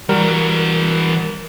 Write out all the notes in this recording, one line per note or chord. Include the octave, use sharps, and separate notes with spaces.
E3 G3 F#4 A#4